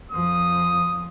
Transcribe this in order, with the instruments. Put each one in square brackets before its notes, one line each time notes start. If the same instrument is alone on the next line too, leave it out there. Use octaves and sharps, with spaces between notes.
[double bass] F2 F3 [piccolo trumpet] D#6